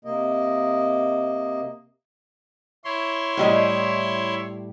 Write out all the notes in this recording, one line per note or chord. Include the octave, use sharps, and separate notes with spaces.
C3 A#3 D#5
E4 C#5 C6
A2 G3 D#5